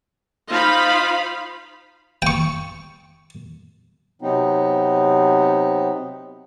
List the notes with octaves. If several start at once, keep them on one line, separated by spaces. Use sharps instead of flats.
D#4 F4 C5 F5 B5
G5 C#6
C3 F#3 B3 C4 D#4